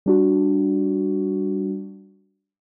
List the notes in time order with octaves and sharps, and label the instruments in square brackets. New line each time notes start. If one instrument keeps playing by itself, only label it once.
[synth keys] G3 D4 F#4